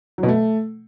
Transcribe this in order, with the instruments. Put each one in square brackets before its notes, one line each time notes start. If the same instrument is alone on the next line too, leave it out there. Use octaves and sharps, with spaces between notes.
[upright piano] F#3
B2
A3